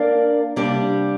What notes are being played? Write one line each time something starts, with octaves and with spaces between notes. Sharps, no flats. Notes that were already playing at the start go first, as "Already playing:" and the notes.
Already playing: A#3 D4 A#4 D5 F5
C3 G3 A#3 D4 G4